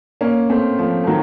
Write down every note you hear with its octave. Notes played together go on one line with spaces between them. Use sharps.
A#3 C#4
A3 C4
F3 A3
A3
D#3 F#3